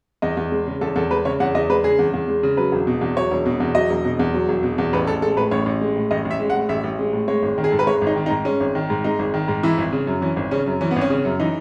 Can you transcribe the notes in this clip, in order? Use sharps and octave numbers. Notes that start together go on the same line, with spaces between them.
E2 D#5
E2
G#3
C#3
E2 A4
E2 A4
G#3 B4
C#3 C#5
E2 F#5
E2 D#5
G#3 B4
C#3 G#4
E2
E2
G#3
C#3
F#3 B4
E1
B2
E2
F#3 C#5
E1
B2
E2
F#3 D#5
E1
B2
E2
F#3
E1
B2
E2
A1 B4
A1 A4
G#3 A4
A2 B4
A1 C#5
A1
G#3
A2
A1 D#5
A1
E5
G#3
F#5
A2
A1 E5
A1
G#3
A2
G#3 C#5
G#1
D#3
G#4
G#2 A4
B4
G#3 C#5
G#1
D#4
D#3
D#4
G#2
G#3 C#4
G#1
D#3
G#2
G#3 D#4
G#1
D#3
G#2
E3 E4
G#1
C#3
F#2
E3 C#4
G#1
C#3 C#4
F#2
E3 C#4
B3
G#1
C#4
C#3
F#2
E3 D#4